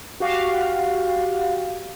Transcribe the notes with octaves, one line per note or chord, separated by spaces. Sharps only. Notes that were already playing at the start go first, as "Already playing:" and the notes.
F#4 G4 F5